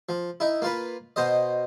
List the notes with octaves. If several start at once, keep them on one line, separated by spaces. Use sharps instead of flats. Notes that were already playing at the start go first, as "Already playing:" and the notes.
F3
D#4 E4
A#3 F4 B4
B2 C5 D#5